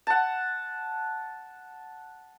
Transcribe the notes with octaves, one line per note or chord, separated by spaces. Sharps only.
F#5 A5